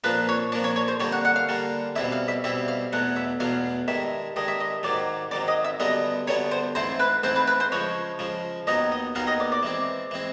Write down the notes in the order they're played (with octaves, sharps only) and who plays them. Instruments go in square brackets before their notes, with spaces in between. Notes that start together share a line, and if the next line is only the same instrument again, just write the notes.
[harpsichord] A#2 F3 A#3 D4 [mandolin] B4
[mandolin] C#5
[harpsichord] A#2 F3 A#3 D4 [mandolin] D5
[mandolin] C#5
C#5
C5
[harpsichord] D3 G3 A#3 [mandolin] C#5
[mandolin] F#5
F#5
F5
[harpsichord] D3 G3 A#3
[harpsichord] B2 G3 C4 E4 [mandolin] E5
[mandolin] F5
E5
[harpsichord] B2 G3 C4 E4 [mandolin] E5
[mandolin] F5
[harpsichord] E2 B2 F#3 A3 [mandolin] F#5
[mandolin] E5
[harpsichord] E2 B2 F#3 A3 [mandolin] F5
[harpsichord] G2 D#3 G#3 [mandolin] E5
[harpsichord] G2 D#3 G#3 [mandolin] D#5
[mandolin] E5
D#5
[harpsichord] G#2 D#3 F#3 [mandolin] D5
[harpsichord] G#2 D#3 F#3 [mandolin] D5
[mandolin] D#5
E5
[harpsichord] F#2 D3 G3 B3 [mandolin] D#5
[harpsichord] F#2 D3 G3 B3 [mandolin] C#5
[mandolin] C5
[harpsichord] G#2 E3 A3 C4 E4 [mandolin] C5
[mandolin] B4
[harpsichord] G#2 E3 A3 C4 E4 [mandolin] C5
[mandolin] B4
B4
C5
[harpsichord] C#3 F3 G#3 [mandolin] C#5
[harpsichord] C#3 F3 G#3
[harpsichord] D#2 D#3 F#3 B3 D#4 [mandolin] D#5
[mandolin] D#5
[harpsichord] D#2 D#3 F#3 B3 D#4 [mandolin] F5
[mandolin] D#5
D5
D5
[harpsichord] E3 G#3 C4
E3 G#3 C4